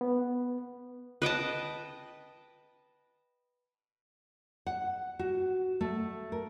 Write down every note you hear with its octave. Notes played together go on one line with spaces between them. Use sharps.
B3
B4 D#5 G5 A5
F#5
F#4
A3
A#4